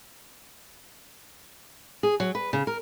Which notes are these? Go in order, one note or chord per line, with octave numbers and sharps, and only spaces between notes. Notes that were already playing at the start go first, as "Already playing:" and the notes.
G#4
F#3
B4
C#3
A#4